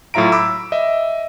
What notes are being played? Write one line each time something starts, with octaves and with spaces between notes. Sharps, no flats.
A2 F#3 F4 E5 A#5 D7
B5 D6 E6
D#5 E5